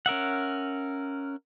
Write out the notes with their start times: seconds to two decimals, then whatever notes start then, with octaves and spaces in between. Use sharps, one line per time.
0.06 C#4 A#4 E5 F#5